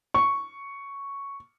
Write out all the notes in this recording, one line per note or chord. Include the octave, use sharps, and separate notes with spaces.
C#6